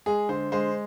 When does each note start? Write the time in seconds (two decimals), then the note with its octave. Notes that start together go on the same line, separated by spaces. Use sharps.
0.06 G#3 G#4
0.29 D3 C5
0.52 G#3 C5